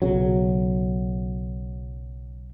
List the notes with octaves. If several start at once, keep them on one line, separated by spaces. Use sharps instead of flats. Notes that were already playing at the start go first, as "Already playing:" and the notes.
B1 C#3 F#3